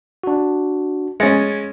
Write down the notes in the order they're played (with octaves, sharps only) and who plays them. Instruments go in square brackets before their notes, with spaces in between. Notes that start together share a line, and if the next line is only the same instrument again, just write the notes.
[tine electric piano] D4 F#4
[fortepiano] G#3 C#4 [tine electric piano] A6 A#6 C#7